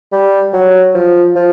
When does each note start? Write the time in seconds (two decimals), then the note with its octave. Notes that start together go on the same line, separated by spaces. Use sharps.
0.12 G3
0.53 F#3
0.95 F3
1.36 F3